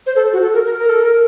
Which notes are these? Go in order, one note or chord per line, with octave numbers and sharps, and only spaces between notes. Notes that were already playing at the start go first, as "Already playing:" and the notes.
C5
A4
F#4
A4
A#4
A#4
A#4
A4
A#4